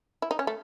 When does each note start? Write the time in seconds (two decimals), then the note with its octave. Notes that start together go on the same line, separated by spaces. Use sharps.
0.22 E4
0.31 D#4
0.39 C#4
0.47 A3